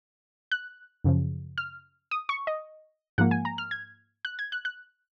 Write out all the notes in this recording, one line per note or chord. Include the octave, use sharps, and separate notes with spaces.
F#6
F#2 C#3 F3
F6
D#6
C#6
D#5
G#2 F3 A#3 F#5
G#5
A#5
F6
G#6
F#6
G#6
F#6
F#6